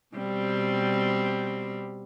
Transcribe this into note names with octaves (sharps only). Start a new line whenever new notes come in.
B2 G3 C4